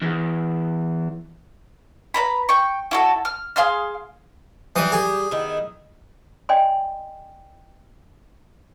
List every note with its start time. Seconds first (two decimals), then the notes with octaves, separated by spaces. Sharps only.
0.02 E2
2.14 B4 D#5 A#5 B5
2.49 G5 C#6
2.91 E4 F#4 A4
3.25 F6
3.56 G#4 F5 C6 F6
4.76 E3 G3 G4 D#6
4.92 G#4
5.31 D#3 B3 E4
6.49 D5 D#5 G5 G#5 C6